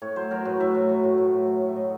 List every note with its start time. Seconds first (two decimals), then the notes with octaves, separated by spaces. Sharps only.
0.02 A2 C#5
0.16 F#3 C5
0.31 F#3 A#4
0.45 A2 B4
0.60 A2 E5
0.74 F#3
0.89 F#3
1.03 A2
1.18 A2
1.32 F#3
1.47 F#3
1.61 A2
1.69 E5
1.76 A2 D#5